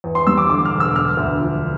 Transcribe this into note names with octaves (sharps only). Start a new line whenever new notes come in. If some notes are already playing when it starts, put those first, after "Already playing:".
E2
C6
G3 E6
D6
D3 D6
F6
E1
E6
D3 F6
D2
F3